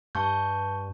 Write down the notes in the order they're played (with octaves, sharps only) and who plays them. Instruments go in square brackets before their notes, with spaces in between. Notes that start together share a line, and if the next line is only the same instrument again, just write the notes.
[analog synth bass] G2 [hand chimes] A5 C#6 G6